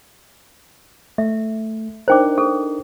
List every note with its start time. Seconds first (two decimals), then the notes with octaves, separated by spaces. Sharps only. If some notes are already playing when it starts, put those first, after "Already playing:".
1.18 A3 E5
2.08 D4 D#4 A#4 C5 G5 D6
2.38 G#4 A4